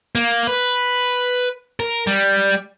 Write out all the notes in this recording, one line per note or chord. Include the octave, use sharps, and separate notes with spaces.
A#3
B4
A#4
G3